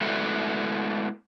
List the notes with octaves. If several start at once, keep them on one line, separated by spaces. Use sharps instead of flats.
G#3 A3 B3 E4 F#4 A4